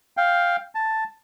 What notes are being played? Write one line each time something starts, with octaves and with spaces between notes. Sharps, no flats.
F5 G5
A5